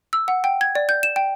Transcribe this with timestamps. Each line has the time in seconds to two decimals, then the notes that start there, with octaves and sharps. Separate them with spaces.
0.13 E6
0.28 F#5
0.44 G5
0.61 G#6
0.75 D5
0.89 G6
1.03 E7
1.16 G5